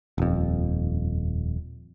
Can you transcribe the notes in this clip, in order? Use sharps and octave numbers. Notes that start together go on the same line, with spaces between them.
D#1 F2